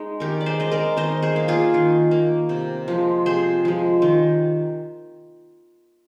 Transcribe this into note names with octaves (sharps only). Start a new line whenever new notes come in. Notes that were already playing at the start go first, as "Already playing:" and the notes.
Already playing: G#3 D#4
D#3 G4 A#4
D5
G#4 C5
G#3 D#5
A#4 D5
D#3 C5 D#5
G#4 C5
A#3
F4 G#4
D#3
A#3
C3
F3 G#3
C3 G#4 C5
F3 G#3
D#3